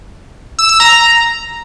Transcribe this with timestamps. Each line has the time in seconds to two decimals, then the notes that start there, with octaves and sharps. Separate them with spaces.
0.59 E6
0.69 E6
0.80 A#5